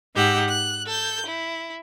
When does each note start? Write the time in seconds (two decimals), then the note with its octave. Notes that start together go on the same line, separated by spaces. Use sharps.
0.15 G#2 D#4 G4 F#5 E6
0.48 F#6
0.86 A4 G6
1.26 E4